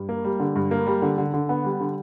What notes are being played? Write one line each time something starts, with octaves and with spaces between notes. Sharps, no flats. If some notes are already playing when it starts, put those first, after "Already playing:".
Already playing: G2
A#3
G3
D3
G2
A#3
G3
D3
D3
D3
B3
G3
D3